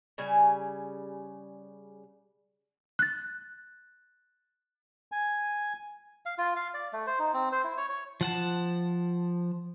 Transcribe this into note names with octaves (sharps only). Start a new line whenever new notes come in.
C#3 G3 G#5
F#6 A6
G#5
F5
F4
F5
D5
A3
C5
D#4
C4
C5
E4
C#5
C#5
F3 F#5 A5